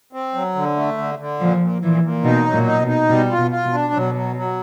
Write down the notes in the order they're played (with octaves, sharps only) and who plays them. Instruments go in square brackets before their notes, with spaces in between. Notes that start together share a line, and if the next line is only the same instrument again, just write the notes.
[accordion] C4
F#3
D3
A3
D3
D3
[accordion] A#2 [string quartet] F3
[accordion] A#2
[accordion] A#2 [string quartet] E3
[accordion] A#2
[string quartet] B2 [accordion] D#4
[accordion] F#3
[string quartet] A#2
[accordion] D#4
[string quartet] B2
[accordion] D#4
[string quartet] B2 [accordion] G3
[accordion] F4
[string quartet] B2
[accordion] F4
[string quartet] B2
[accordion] D4
[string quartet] B2 [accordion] F#3
[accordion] F#3
F#3